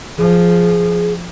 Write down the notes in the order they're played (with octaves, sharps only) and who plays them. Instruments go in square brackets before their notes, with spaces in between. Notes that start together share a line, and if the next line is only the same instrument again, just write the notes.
[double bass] F3 [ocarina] G#4